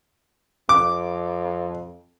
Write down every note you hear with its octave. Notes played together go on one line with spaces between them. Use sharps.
F2 D6